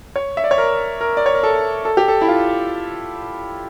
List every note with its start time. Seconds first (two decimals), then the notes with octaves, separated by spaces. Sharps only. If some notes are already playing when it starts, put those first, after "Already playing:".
0.16 C#5
0.37 E5
0.44 D5
0.51 C#5
0.58 A#4
1.01 A#4
1.17 D5
1.26 C#5
1.34 A#4
1.43 A4
1.85 A4
1.97 G4
2.08 A4
2.22 E4
2.28 F4